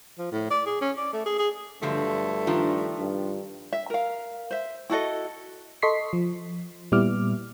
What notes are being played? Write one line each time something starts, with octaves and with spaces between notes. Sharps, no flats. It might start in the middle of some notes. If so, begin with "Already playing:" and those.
F3
A2
D5
G#4
C#4
D5
A3
G#4
G#4
G2 D3 F3 F#3 A3
D#3 F3 D4 F4
G2
E5
A#4 F5
C5 E5
E4 F#4 A4 D#5
A4 D#5 C6 C#6 B6 C7
F3
A#2 G3 B3 E4 D6 F6